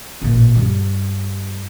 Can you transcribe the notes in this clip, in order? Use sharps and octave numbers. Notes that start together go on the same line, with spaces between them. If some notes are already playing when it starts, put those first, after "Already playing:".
A1 A#2
G2 G3